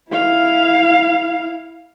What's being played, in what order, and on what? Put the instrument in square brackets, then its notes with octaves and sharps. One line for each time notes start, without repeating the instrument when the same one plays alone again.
[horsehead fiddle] E4 F5